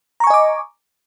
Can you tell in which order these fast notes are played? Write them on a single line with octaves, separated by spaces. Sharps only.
A#5 C#6 G#5 D#5 D6